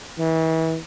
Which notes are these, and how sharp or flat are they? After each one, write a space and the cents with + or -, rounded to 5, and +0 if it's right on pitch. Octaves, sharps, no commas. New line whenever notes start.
E3 -35